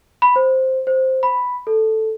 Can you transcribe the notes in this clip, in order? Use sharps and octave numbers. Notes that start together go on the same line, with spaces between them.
B5
C5
C5
B5
A4